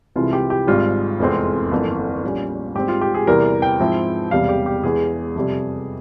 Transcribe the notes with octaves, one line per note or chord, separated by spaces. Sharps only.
C2 C3 E3 G#3 E4 F4
G4
G4
G#1 G#2 G3 F4
F1 E2 E3 G#3 C4
G1 F2 E3 A#3
A#1 A#2 G3 C#4
G#2 G3 C4 G4
F4
G4
G#4
E2 C3 E3 G3 A#4
G5
G#2 F3 C4 E4
E1 E2 C3 G3 F5
G4
G4
E1 E2 E3 G#3 G#4
F2 C3 G3